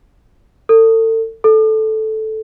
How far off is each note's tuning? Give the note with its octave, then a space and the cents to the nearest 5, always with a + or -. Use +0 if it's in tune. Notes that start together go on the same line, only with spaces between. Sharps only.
A4 +35
A4 -10